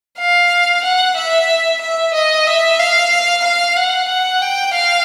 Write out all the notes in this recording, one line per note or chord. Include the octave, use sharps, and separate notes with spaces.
F5
F#5
E5
E5
D#5
E5
F5
F5
F#5
F#5
G5
F5